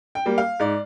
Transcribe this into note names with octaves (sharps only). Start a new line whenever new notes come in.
G5
G3 A#3
F5
G#2 D5